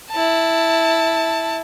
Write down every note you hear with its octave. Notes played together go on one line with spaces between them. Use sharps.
E4 A5